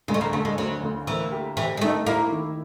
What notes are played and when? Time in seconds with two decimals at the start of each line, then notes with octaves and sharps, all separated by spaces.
0.08 D2 G#3
0.14 A3
0.21 A#3
0.33 D2 A3
0.45 G#3
0.57 D2 F#3
0.83 D2
1.07 E3 A#3
1.32 G4
1.57 E3 G4
1.77 G#3
1.81 A3 D#4
2.07 A#3 E4
2.31 D#3